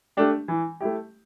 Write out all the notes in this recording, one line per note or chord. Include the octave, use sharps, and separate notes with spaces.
A3 D4 G4
E3
A3 E4 G4